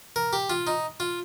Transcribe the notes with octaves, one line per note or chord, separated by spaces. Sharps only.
A#4
G4
F4
D#4
F4